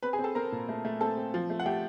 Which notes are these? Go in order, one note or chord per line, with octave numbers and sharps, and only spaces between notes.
C4 B4 B5
G#4 G#5
C4
A4 A5
C4 A#4 A#5
A#2
A3
A3
C4 A4 A5
C4
F3
A3
F#5
A3 G4 G5